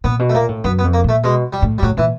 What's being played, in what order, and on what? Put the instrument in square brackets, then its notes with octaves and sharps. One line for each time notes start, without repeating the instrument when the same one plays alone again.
[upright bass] A#2 [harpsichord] B3
[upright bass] B2
[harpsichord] A3
[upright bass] A#2 [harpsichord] A#3
[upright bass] A2
[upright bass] F#2 [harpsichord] B3
[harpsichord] B3
[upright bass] F2
[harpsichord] A#3
[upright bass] A#2 [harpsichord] A3
[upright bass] B2 [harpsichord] G#3
[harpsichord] G3
[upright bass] A2
[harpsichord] G3
[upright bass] A2 [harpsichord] F#3
[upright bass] A#2 [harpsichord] E3